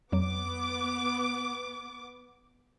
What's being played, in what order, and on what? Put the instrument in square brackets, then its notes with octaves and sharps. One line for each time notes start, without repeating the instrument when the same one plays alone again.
[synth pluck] F2 F#3 [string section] B3 D6